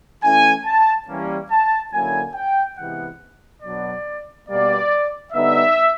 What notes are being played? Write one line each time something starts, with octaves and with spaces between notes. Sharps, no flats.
E3 A3 C#4 E4 G#5
A5
E3 G3 A#3 C#4
A5
D3 F#3 A#3 C#4 E4 G#5
G5
C3 E3 G#3 B3 F#5
B2 F#3 B3 D4 D5
B2 G3 A#3 D5
D3 G3 B3 D#4 E5